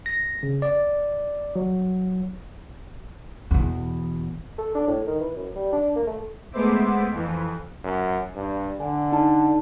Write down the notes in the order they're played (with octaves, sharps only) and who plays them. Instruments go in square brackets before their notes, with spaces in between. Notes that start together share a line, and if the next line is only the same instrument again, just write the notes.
[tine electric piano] A#6
C#3
D5
F#3
[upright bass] E2 B2
[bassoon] A4
D4
A2
D#3
E3
F#2
G3
D4
A#3
A3
[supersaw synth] G#3 A3 B3 C5 E5 D6
F2 E3
[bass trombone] F#2
G2
[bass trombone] D3 [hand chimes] G#5
[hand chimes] D#4 A5